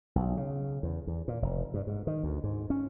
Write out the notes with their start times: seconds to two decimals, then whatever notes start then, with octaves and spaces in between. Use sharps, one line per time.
0.16 B1
0.37 C#3
0.83 E2
1.07 E2
1.28 A#2
1.42 F1
1.74 G2
1.87 G#2
2.07 D#3
2.23 D2
2.44 G#2
2.70 C#4